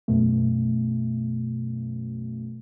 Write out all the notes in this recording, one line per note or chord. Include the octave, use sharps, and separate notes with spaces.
F#2 B2 A3